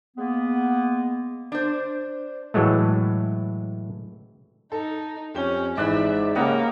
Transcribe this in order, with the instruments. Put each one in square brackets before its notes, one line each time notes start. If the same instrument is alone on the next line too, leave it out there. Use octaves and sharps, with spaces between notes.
[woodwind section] G#3 A#3 B3
[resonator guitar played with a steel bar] D4 C5
[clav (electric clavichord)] A2 E3 F#3 G#3 A3
[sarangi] D#4 [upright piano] A4
[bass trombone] F2 [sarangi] C#4 [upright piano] G4 G7
[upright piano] G#1 E3 F#6 [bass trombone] G#2 [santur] D5 B5 [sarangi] E5
[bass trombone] C#3 [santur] G3 D#5 F#5 [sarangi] A#3